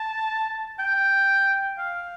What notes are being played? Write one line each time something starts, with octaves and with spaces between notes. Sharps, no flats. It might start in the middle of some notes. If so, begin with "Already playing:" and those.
Already playing: A5
G5
F5